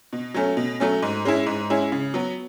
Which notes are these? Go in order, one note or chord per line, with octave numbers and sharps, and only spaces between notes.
B2
F#3 A3 C#4
B2
F#3 A3 C#4
G#2
G#3 C#4 E4
G#2
G#3 C#4 E4
C#3
F#3 B3